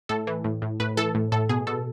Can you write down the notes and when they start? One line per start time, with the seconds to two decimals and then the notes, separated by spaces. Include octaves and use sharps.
0.09 A2 A4
0.27 E3
0.44 A2
0.62 A2
0.80 A2 B4
0.97 E3 A4
1.15 A2
1.32 A2 A4
1.49 B2 G#4
1.67 B2 A4